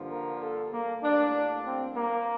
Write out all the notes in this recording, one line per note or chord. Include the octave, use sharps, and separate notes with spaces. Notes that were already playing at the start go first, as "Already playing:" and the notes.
Already playing: G2 D3 F3 A#3
A#4
A4
A#3
A2 G3 A#3 D4
C4
A#3